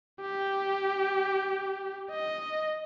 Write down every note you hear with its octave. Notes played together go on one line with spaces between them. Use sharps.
G4
D#5